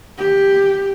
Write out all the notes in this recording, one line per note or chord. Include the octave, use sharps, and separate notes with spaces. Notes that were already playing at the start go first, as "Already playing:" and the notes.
G4